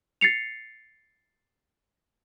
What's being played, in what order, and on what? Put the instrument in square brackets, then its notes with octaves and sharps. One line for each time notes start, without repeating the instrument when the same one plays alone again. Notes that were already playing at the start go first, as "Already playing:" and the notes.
[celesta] A6 C7 C#7 F7